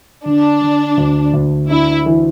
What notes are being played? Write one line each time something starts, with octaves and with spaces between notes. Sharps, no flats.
D3 D4
D3
D2
D2
D4 E4
E3